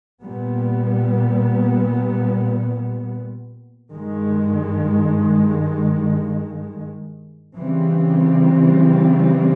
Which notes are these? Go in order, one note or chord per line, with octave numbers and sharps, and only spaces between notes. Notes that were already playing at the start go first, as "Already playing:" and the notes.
A#2 G3 B3
G2 D#3 G#3
C#3 E3 G3 C4